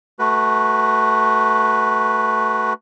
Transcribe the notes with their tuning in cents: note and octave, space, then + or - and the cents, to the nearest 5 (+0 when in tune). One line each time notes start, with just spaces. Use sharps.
A3 +0 F#4 +15 B4 -5